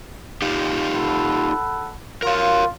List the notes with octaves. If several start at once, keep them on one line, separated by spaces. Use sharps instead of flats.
D#4 F4 G4
A4 F#5 B5
F4 A#4 C#5